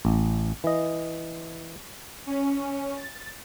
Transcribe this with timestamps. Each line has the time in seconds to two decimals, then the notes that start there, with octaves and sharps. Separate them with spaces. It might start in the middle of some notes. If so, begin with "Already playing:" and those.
0.05 A1
0.64 E3 D#5
2.26 C#4
2.95 A6